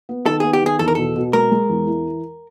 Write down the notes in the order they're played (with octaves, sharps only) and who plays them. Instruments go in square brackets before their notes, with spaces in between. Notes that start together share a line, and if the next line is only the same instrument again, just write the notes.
[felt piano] B3
[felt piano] D#3 [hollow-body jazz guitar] A4
[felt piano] B3 [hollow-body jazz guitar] G#4
[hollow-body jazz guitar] G4
[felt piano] D#3 [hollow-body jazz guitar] G#4
[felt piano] E2 [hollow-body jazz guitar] A4
[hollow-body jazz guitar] A#4
[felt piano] B2 [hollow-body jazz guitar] A4
[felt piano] B2
[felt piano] G#3 [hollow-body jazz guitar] A#4
[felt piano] G#3
E2
E3